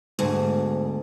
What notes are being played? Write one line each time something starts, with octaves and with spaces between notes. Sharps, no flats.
D2 G#2 B2